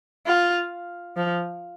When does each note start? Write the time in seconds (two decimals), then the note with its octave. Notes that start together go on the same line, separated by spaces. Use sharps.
0.26 F4
1.17 F3